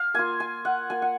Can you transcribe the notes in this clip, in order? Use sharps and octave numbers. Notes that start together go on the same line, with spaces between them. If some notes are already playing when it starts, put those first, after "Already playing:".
Already playing: F5
A#3 F4 G#5
G#5
F#5
A#3 F4 G#5
F#5